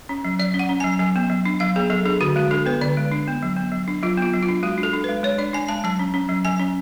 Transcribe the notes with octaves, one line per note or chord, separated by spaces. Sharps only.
C#4
F#3
F#3 D5
C#4
F#5
C#4
G#5
F#3
F#3 G#5
B3
F#3
D4
F#3 F5
B3 G#4
F#3 A4
D4 G#4
D3 F#4
G#3 F#4
D4 A4
B3 B4
D3 D5
G#3
D4
B3
F#3
B3
F#3
D4
F#3 F4
B3 F4
F#3
F4
D4
G#3 F#4
D4
A4
D4
B4
G#3
G#3 C#5
D4 D5
D4 G#5
G#3 A5
F#3 A5
C#4
C#4
F#3
F#3 G#5
C#4